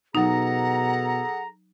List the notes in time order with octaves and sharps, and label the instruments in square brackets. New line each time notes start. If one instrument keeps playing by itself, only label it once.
[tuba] B2 [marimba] F#3 D#4 [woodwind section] G#4 A4 A#5 [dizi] F#5